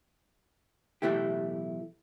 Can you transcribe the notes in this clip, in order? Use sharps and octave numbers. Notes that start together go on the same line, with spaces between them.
B1 A2 E3 A3 E4 G4